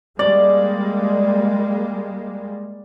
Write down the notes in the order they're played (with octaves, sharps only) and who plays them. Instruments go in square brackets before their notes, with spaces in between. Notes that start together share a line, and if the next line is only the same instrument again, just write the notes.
[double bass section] G3 G#3 A#3 [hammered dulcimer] D5